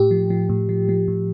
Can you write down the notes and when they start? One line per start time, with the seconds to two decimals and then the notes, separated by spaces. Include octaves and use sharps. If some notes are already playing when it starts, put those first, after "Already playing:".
Already playing: A2 G4
0.11 F3
0.30 F3
0.49 A2
0.69 F3
0.89 F3
1.08 A2